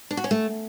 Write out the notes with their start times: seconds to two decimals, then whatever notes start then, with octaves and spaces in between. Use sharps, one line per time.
0.11 D4
0.17 F#4
0.24 C#4
0.31 A3